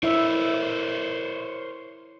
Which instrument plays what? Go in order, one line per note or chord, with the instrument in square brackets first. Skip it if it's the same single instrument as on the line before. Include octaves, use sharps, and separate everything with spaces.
[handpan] E4 E5 [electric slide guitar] A#4 C5 C#5